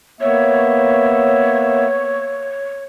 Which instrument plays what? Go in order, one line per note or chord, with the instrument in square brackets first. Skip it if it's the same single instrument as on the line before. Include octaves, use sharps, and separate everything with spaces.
[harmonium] A#3 B3 E5 [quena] C#5